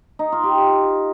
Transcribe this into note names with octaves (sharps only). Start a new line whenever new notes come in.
D#4
F4
G4